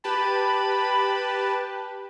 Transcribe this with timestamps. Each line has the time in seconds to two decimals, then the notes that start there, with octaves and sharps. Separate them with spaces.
0.04 G4 B4 A5 B5